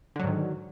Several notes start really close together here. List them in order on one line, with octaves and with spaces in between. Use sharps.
D3 F#3 G#2 D#3